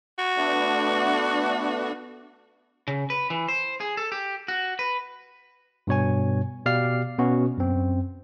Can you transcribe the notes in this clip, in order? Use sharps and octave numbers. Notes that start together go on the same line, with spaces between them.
F#4
A3 B3 D4
C#3
B4
E3
C5
G#4
A4
G4
F#4
B4
G2 B2 C#5 G#5
B2 G4 D5 F5 F6 C7
B2 B3 C#4 F#4
F#2 C4